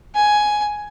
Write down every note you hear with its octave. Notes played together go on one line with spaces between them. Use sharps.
G#5